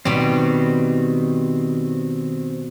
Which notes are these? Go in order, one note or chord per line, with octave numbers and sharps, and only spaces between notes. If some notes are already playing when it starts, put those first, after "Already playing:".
B2 D#3 G3 C4